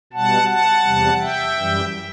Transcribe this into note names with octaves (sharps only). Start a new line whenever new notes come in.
B2 G3 F#5 A5
F#5 A5
E2 C3 G3
E5 G5
F#2 E3 G3